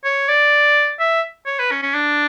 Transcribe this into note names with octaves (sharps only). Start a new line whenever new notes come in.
C#5
D5
E5
C#5
B4
C#4
C#4
D4